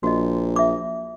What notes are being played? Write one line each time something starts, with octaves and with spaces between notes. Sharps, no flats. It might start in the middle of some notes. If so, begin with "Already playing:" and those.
A#1 F#4 D#5
E5 D6